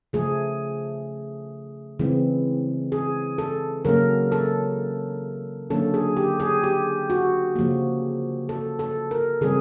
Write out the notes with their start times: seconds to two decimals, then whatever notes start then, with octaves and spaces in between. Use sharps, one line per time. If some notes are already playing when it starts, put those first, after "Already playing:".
0.13 C#3 F3 A3 G#4
1.99 C#3 E3 G#3 C4
2.92 G#4
3.38 A4
3.85 C#3 F#3 A#3 C#4 A#4
4.32 A4
5.70 D3 F#3 A#3 C#4 A4
5.94 G#4
6.17 G4
6.40 G#4
6.63 G4
7.10 F#4
7.56 C#3 F3 A#3
8.49 A4
8.79 A4
9.11 A#4
9.41 C#3 E3 G3 C4 G#4